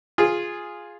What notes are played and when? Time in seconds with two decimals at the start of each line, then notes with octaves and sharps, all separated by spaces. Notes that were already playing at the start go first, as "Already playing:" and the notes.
0.18 F4 G#4